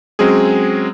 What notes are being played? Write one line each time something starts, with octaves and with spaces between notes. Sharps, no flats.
F#3 G#3 C4 C#4 G#4